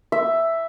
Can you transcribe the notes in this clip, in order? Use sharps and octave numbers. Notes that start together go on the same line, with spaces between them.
E5